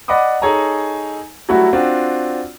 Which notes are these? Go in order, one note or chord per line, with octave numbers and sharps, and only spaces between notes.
D5 D#5 F#5 B5 D6 D#6
D#4 G#4 A4 C#5 G#5 A#5
F#3 G3 A3 E4 F#4
C4 D4 F4 F#4